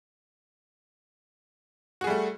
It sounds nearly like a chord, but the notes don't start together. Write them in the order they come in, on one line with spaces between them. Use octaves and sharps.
F#4 G#4 G3 A3